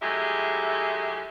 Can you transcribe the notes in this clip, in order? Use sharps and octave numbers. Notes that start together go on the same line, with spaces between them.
F#3 G#3 A3 E4 G4 G#4